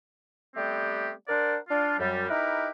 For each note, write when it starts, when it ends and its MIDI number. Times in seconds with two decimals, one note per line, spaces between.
0.56 1.11 55
0.56 1.11 57
0.56 1.11 59
0.56 1.11 60
0.56 1.11 67
1.28 1.56 62
1.28 1.56 70
1.28 1.56 72
1.28 1.56 74
1.28 1.56 78
1.69 1.96 62
1.69 1.96 65
1.99 2.29 42
1.99 2.29 55
2.29 2.68 63
2.29 2.68 64
2.29 2.68 67
2.29 2.68 70
2.29 2.68 71